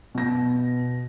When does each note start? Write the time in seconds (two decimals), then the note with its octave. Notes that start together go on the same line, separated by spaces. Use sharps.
0.15 B2 A#6